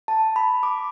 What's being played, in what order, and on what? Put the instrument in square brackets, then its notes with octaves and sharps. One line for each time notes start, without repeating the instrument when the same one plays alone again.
[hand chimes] A5
B5
D6